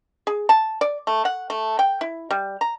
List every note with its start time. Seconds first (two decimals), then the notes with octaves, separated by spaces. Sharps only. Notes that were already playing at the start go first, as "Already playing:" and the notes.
0.27 G#4
0.49 A5
0.81 D5
1.07 A3
1.25 F#5
1.50 A3
1.79 G5
2.01 E4
2.31 G3
2.61 A#5